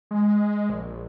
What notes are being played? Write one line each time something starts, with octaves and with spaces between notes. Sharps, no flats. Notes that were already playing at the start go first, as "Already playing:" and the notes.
G#3
A#1